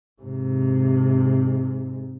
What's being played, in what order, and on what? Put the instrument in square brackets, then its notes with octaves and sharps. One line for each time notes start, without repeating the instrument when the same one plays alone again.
[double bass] G#2 C3